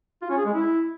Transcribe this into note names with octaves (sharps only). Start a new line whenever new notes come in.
F4
C#4
G#4
G#3
E4